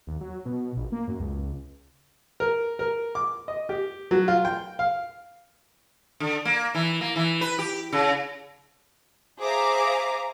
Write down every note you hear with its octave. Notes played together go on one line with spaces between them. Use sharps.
D#2
F#3
B2
A#1
A#3
F#2
C#2
A#4
A#4
D6
D#5
G4
F#3
F4
G5
F5
D3
A#3
E3
A#3
E3
B4
G4
C#3
G#4 C5 E5 F5 A#5 D6